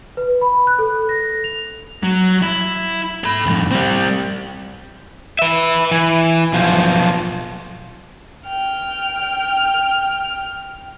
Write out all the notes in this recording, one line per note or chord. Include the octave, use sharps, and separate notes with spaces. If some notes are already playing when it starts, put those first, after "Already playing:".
B4
B5
F#6
A4
A#6
F7
F#3
E4
A4 B5
F2 A2
G3 C4
B4 E5
E3
B1 F3
G5 F6